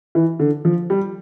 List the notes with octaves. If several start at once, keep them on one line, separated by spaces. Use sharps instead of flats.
E3
D3
F3
G3